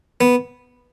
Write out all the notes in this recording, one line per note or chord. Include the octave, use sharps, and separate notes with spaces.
B3